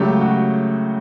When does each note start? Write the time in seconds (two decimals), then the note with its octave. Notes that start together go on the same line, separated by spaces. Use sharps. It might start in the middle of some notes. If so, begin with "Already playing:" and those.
Already playing: C#2 C#3 F#3 A3 G4
0.21 F#4